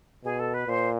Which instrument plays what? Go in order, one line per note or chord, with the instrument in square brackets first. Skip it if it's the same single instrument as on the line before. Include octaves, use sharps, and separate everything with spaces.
[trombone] B2 [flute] G#4
[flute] A4
B4
[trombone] A#2 [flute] C5